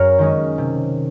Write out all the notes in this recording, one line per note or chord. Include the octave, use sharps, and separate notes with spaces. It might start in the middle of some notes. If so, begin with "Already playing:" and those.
Already playing: F#2 A#4 C#5
D#3 G#3 C#4
C3